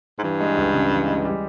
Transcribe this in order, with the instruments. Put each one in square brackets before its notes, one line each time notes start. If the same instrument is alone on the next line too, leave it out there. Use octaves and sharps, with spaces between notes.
[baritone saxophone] G#2
[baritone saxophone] G2 [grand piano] E3
[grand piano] G#3
C#2
C#3
E3
G#3
G3